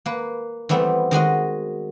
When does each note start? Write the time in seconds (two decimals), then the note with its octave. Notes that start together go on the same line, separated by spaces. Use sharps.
0.06 A#3 B4
0.69 E3 G3 A3 B3 C4
1.11 D#3 G#3 F#4 D#5